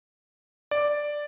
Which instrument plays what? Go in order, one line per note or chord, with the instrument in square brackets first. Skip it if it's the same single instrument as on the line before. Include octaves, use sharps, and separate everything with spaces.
[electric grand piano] D5